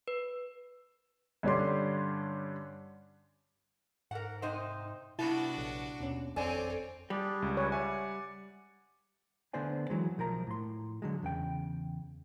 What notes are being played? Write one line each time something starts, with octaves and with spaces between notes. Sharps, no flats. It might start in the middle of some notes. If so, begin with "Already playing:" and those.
B4
G2 D3 C#4 D4 G4 C6
G#2 A#4 F#5
C3 D#4 C5
G2 C3 B3 D4 E4 F#4 A5 A6
A#1
D#2 B2 C#4
G#1 F2 C4 A4 C#5 D5 G#5
G3 D4 G4 G#4
C#2
C#4 B4 C#5
D5 E5 F#5 G#5
D3 A3 B3 C5 D5 G#5
E3 F#3 G#3
B1 F3 A#4 A#5
A2 C6
D3 F#3 G#3
E2 C#3 G5